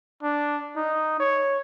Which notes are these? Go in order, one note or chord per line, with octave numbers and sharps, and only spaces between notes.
D4
D#4
C#5